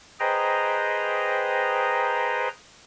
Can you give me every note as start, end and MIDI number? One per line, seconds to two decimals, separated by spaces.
0.20 2.48 68
0.20 2.48 71
0.20 2.48 72
0.20 2.48 75
0.20 2.48 79
0.20 2.48 82